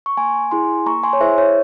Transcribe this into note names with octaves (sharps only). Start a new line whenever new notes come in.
C#6
A#3 G#5 C6
E4 G#4 G#5 C6
A#3 A#5 C#6
G#5 C6
C#5
E4 G#4 C5 E5
C#5